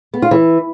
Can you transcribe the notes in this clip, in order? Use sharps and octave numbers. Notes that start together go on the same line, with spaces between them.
B3
F4
E3